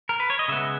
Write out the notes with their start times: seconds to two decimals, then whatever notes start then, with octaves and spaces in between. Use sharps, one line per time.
0.09 A#4
0.20 B4
0.30 C#5
0.39 D#5
0.48 C#3 G#3 B3 E5